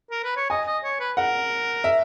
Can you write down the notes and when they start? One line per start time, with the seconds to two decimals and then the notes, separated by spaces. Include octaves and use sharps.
0.11 A#4
0.24 B4
0.37 C#5
0.50 D#5 G#5
0.67 D#5
0.84 C#5
1.00 B4
1.17 A#4 F#5
1.84 E5